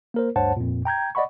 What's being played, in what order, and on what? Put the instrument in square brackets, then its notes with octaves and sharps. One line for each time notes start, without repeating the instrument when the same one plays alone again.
[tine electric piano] A#3 A#4 C5
D2 G2 C5 C#5 F#5 A5
F2 A#2
G5 A#5 G6 G#6
D5 D#5 F#5 B5 C#6